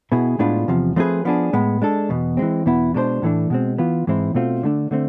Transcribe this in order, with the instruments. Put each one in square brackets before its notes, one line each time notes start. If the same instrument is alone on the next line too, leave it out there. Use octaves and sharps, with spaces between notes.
[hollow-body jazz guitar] B2 B3 E4 G#4
A2 G#3 B3 D4 F4
E2 C3 F3
F3 A3 C4 G#4 B4
F3 B3 D4 G#4
A2 G#3 B3
G#3 D4 A4
E2 B2 B3
E3 G#3 C4
E2 B2 B3 E4
B2 G#3 D4 A4 C5
A2 E3 A3 D4
B2 G#3 C4
E3 B3 F4
G#2 E3 G#3 C4 E4
B2 A3 C4 F4
D3 A3 D4
D3 A3 C4